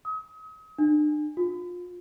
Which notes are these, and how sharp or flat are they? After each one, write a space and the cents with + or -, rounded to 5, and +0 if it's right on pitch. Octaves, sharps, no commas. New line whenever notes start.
D#6 +40
D4 +40
F4 +25